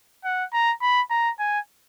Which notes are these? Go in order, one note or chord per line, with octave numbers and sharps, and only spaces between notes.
F#5
A#5
B5
A#5
G#5